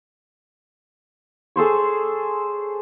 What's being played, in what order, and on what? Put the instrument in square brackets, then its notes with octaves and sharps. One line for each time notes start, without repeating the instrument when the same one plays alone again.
[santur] G#4 A4 C5 C#5